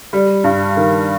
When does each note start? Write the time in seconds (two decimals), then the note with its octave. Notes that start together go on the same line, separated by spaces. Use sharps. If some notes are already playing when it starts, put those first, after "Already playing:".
0.13 G3
0.44 G2
0.76 D#3